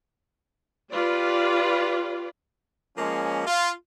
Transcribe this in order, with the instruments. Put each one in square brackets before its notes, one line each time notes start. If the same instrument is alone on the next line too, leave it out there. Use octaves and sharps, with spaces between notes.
[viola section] F4 G4 B4 D5
[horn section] F3 G#3 A#3 C#4
F4